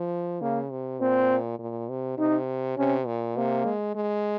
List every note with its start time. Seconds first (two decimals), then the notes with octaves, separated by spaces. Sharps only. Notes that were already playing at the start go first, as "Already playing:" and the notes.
Already playing: F3
0.41 C#3 A#3
0.70 C3
1.01 A#2 C4
1.59 A#2
1.89 C3
2.18 C3 D#4
2.77 C3 C#4
3.07 A#2
3.36 C3 A#3
3.65 G#3
3.95 G#3